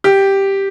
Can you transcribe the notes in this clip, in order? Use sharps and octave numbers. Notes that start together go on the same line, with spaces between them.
G4